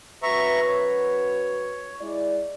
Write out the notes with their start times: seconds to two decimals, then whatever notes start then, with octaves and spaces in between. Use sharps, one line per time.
0.23 F#2 F#4 B4 E5 A#5 C#6
0.68 C#5
2.00 G#3 E4 D5